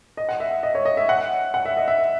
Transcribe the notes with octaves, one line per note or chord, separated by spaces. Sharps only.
D#5
F#5
E5
D#5
C#5
D#5
E5
F#5
F#5
E5
D#5
E5